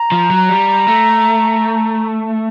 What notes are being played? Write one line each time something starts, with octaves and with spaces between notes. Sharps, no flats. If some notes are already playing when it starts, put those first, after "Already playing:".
Already playing: A#5
F3
F#3
G3
A3